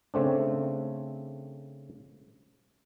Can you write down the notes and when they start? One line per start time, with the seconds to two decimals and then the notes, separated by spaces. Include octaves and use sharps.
0.14 C#3 A3 C4 D4